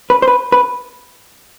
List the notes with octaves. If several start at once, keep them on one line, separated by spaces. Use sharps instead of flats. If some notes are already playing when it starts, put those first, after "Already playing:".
B4
C5
B4
B4